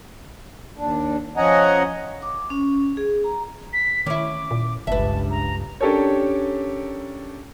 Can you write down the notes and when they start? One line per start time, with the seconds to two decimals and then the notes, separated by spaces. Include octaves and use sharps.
0.78 D#2 D4
1.37 F3 C#4 D#5 F#5 G#5 A#5
2.22 D6
2.50 C#4
2.97 G#4
3.24 A#5
3.73 B6
4.06 D#3 C#4 E4 D6
4.51 A#2
4.87 G1 C#2 G2 B4 E5 A5
5.31 A#5
5.81 C#4 D4 G4 A4 A#4 C#5